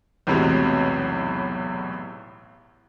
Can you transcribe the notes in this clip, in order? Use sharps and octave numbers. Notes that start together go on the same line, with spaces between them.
B1 E2 A2 C3 F#3 G#3